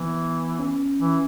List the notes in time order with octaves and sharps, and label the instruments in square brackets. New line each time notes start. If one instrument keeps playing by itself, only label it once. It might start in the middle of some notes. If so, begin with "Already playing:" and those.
Already playing: [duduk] E3 [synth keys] B3
[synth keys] C#4
[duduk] E3